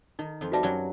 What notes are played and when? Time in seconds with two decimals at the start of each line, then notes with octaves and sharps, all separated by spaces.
0.19 D#3 D#4
0.41 F2 F3
0.52 G3 F#4 B4 E5 A5
0.63 F#2 F#3